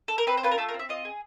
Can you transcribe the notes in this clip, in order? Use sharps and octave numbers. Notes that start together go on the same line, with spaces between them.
A4
A#4
C4 B4
C5
F4 B4
A#4
A3 A4
A#4
C4
E5
F4 D#5
G#4